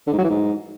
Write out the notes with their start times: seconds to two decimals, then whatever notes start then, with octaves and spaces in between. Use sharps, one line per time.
0.07 D3
0.13 G#2
0.18 F#3
0.24 E3
0.30 G#2